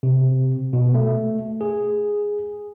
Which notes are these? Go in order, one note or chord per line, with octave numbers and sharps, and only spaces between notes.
C3
B2
A3
G#4